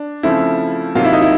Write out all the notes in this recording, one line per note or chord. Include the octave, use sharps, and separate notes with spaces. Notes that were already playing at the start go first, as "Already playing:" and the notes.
Already playing: D4
C#3 F3 A3 C4 E4
C3 D#3 F#3 A#3 F4
E4
D#4
E4